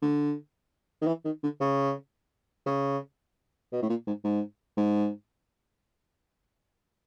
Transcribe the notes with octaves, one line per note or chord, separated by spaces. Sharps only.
D3
D#3
E3
D#3
D3
C#3
C#3
B2
A2
A#2
G#2
G#2
G#2